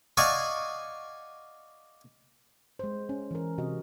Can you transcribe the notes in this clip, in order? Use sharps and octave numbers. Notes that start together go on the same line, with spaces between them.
D5 D#5 F5 F#5 G#5 C#6
G#3 C5
C#4
E3 A#4
C3 F#4 D#5